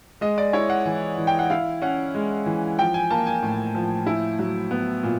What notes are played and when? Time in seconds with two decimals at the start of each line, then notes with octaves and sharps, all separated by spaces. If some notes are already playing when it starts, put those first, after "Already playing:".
0.21 G#3 D#5
0.38 D5
0.53 E4 C#5
0.70 F#5
0.86 E3
1.18 E3
1.27 G5
1.39 F#5
1.50 E4 F5
1.82 C#4 F#5
2.15 G#3
2.46 E3
2.79 F3 G5
2.94 G#5
3.10 A#3 A5
3.27 G#5
3.42 A2
3.75 F3
4.06 E4
4.39 F#3
4.71 B3
5.03 A#2